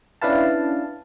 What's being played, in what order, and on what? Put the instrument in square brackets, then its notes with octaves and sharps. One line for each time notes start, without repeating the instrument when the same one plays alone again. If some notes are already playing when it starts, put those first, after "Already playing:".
[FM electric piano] C#4 D4 E4 B4 F5 A5